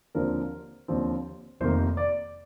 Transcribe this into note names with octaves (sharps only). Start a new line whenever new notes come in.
D#2 D3 F3 C4 A#4
D#2 D3 F3 C4
F1 F2 C3 D#3 A#3 C5
D5